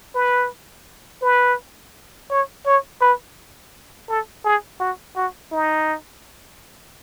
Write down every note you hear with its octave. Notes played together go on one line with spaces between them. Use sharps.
B4
B4
C#5
C#5
B4
A4
G#4
F#4
F#4
D#4